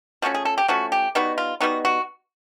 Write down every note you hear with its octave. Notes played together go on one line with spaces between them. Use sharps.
F3 A3 C#4 F#4
G#4
A4
G4
F3 A3 C#4 F#4
G4
G3 B3 D#4 F#4
F4
G3 B3 D#4 F#4
F#4